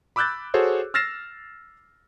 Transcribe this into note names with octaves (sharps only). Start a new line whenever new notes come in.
B5 D6 E6 F#6 G6 A6
F#4 G#4 A4 C5 C#5
E6 F6 A6 A#6 C7 E7